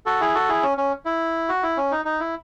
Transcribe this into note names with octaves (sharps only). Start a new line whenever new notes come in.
F#4 A4
E4 G#4
F#4 A4
E4 G#4
C#4
C#4
E4
F#4
E4
C#4
D#4
D#4
E4